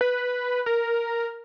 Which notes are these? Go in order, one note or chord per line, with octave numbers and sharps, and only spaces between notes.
B4
A#4